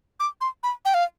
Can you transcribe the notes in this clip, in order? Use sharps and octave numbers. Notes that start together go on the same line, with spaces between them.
D6
C6
B5
G5
F5